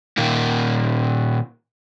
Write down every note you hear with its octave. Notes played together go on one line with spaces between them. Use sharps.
A#2 D#3 A#3